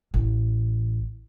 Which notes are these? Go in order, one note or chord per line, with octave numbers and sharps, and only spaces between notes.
A1